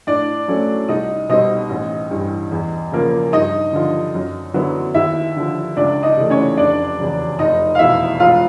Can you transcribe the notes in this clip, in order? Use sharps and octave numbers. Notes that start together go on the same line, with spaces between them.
A2 D4 D5
F#3 A3 C#4
C2 D#4 D#5
B2 G3 C4 D#4 D#5
A1
G2 E3
E2
C#3 F3 A#3
G2 D#4 D#5
D3 F3
F#2
D3 F#3 B3 E4
D#2 E4 E5
D3 F3
C#2 D4 D5
D#4 D#5
C3 E3 A3
C#4 C#5
F1 D4 D5
E2 C#3 F#3
F1 D#4 D#5
F5
E2 B2 E4 E5
E1 F4 F5